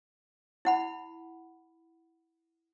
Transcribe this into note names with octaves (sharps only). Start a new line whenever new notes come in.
E4 F#5 B5